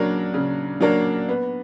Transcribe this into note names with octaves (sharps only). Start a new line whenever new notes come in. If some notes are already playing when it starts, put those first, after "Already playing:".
Already playing: C#3 F#3 A#3 D4 A#4
C#3
F#3 A#3 D4 A#4
B3